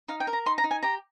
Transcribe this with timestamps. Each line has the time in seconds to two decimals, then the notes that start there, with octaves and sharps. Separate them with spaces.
0.08 D#4 F5
0.20 G5
0.27 A#4
0.33 A#5
0.46 D#4 C6
0.58 A#5
0.64 D#4
0.71 G#5
0.83 G4 A#5